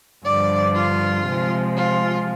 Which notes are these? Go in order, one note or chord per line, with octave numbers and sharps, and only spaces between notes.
G2 D3 F3 D5
F4
C3 F3 G#3
F4